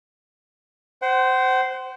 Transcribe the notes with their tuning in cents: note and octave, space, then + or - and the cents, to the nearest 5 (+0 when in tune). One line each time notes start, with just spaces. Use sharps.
C5 -10 F#5 +40